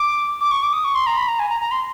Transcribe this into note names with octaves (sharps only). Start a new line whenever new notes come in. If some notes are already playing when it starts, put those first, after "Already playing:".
Already playing: D6
D6
C#6
D6
D#6
C#6
C6
A#5
B5
A#5
G#5
A#5
A#5
C6